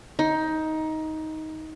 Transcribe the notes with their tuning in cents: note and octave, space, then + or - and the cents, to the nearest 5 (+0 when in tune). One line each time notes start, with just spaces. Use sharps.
D#4 +15